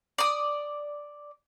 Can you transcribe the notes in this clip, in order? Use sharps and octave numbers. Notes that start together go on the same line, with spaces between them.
D5 D#6